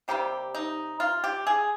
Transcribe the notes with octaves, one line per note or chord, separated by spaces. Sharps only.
C3 D#3 G3 A#3 G4
D#4
F4
G4
G#4